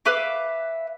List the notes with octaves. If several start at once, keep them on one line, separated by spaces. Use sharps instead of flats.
B4 E5 F5 D6